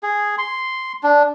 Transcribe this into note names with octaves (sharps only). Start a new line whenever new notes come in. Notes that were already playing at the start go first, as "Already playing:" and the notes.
G#4
C6
D4